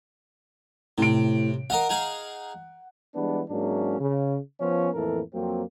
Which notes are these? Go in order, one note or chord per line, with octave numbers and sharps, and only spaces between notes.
A2 C3 D7
A#4 D#5 F5 F#5
D#4 G#4 F5
E3 G3 G#3 B3 D4
G#2 F#3 G#3 A#3 C#4 D4
C#3
F3 B3 C#4
F2 A2 E3 A#3 A4 A#4
F2 F#3 A#3 C4